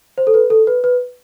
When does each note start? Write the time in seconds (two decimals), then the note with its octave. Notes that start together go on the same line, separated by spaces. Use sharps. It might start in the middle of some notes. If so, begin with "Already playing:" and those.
0.18 C5
0.27 A4
0.34 B4
0.50 A4
0.67 B4
0.84 B4